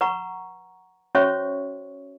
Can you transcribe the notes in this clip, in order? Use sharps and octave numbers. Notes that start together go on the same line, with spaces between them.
B4 F#5 A#5 C#6
C#4 F#4 C5 C#5 E5 C#6